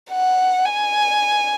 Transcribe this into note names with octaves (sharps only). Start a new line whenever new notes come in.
F#5
G#5